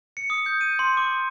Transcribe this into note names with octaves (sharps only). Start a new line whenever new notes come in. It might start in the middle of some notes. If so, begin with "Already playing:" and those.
C#7
D#6
G6
D#7
C6
D6